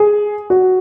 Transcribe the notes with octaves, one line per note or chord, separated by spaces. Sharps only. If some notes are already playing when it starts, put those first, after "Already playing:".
Already playing: G#4
F#4